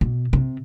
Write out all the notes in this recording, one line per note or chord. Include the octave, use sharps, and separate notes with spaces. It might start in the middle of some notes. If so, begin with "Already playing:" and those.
B2
C3